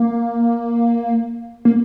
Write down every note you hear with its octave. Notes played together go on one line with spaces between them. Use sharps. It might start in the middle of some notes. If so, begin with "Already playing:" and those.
Already playing: A#3
A#3